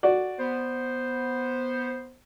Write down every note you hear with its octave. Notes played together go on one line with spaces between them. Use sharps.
F#4 D5
B3 C5